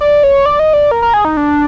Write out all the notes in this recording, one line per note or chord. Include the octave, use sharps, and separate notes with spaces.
D5
C#5
D5
D#5
D5
A#4
A#4
G#4
D#4
D4